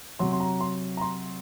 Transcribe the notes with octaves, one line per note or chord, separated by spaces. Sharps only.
C3 F#3 C6
C6
A#5
C6
A#5
C6